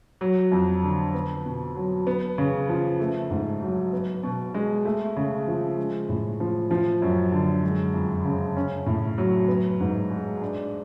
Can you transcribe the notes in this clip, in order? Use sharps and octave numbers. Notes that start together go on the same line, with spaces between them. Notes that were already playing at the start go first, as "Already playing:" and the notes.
F#3
F2
D3
B3
B2
F#3
B3
C#3
F3
A3
G#2
F#3
B3
B2
G#3
A3
C#3
F3
G#3
A2
F3
F3
F#2
D3
G#3
F2
C#3
C#4
A2
F#3
B3
G#2
G#3
D4